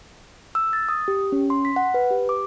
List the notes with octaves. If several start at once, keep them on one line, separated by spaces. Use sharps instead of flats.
E6
A6
D#6
G4
C#4
C6
B6
F#5
B4
G4
D6